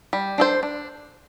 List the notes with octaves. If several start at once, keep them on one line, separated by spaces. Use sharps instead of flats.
G3
D4 A4 C5
D4